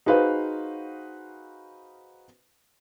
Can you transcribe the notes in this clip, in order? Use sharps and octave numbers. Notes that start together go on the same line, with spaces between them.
D#4 F#4 G#4 B4 C5 F5